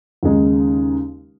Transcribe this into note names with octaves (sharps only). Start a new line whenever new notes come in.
D#2 C#3 G#3 D#4